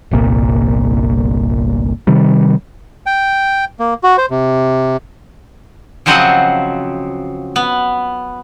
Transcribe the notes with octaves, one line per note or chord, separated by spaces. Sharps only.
G1 C2 A#2
C3 D#3 G3
G5
A#3
F#4
C5
C3
C#3 F3 F#3 C4 D#5 F#5
B3